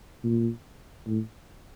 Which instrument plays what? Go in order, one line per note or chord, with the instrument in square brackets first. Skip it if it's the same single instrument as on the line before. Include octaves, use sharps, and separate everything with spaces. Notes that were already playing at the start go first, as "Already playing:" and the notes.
[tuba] A#2
A2